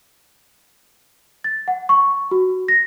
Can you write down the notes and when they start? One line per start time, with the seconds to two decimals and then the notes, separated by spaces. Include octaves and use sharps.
1.44 A6
1.68 F#5
1.89 C#6
2.31 F#4
2.68 A#6